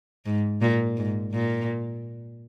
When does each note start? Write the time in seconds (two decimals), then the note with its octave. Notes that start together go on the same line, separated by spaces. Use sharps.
0.26 G#2
0.62 A#2
0.97 G#2
1.33 A#2